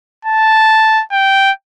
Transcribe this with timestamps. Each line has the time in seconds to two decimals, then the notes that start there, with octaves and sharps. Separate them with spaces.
0.25 A5
1.12 G5